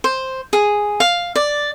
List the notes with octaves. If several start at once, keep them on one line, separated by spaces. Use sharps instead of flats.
C5
G#4
F5
D5